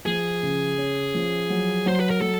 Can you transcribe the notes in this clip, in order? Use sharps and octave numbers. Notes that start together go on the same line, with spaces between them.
F3 G#4
C#3
C#4
F3
F#3
F#3 C5
B4
A#4
F#3 A4